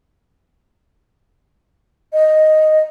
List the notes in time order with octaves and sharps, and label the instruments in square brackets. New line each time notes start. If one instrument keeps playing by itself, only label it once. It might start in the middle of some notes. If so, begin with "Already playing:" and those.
[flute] D#5